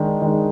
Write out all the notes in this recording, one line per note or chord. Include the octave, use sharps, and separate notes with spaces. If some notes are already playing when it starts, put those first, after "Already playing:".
Already playing: D#3 G#3 D4
D#3 G#3 D4